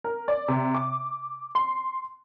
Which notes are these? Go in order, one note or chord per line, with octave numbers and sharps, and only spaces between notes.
A#4
D5
C3
D6
C6